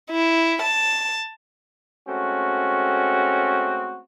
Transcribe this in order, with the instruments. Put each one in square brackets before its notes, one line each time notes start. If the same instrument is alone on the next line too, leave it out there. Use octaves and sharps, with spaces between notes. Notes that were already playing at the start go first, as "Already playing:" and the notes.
[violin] E4
A5
[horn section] G#3 A3 C4 C#4 F#4